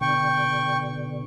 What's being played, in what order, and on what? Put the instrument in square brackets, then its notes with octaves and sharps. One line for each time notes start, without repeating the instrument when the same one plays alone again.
[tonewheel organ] B2 D3 [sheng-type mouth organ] G5 C#6